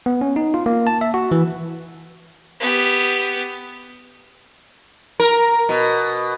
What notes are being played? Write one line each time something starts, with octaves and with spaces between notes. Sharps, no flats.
B3
C#4
D#4
F4
A#3
A5
E5
F#4
E3
B3 G4
A#4
B2